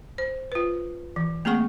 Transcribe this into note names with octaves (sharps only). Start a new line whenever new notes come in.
C5
F4 B4
E3
A3 A#3 C4 G#4 F#5 C#6